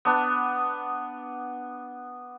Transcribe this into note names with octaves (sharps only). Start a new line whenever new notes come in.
B3 D4